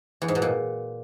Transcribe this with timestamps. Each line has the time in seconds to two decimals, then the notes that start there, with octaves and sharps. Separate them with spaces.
0.22 E2
0.28 G#2
0.35 B2
0.42 A#2